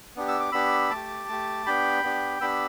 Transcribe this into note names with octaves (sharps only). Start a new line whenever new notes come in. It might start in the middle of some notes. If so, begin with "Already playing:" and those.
B3 D4 G4
E6
D6
B3 D4 G4 B5 E6
A3 A5 D6
G4
A3 G4
B3 D4 G4 G5 B5
B3 D4 G4
B3 D4 G4 B5 E6